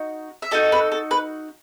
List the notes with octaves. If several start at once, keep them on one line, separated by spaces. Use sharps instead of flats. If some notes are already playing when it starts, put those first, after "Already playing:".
Already playing: D#4 F#4
E5
D#4 F#4 A4 D#5
B4
A4
B4